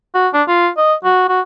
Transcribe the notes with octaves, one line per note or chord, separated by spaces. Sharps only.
F#4
D4
F4
D#5
F#4
F#4